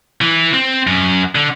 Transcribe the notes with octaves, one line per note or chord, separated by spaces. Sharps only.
E3
C4
F#2
D3